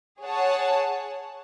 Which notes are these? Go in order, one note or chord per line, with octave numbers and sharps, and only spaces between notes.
G#4 C#5 F#5 A5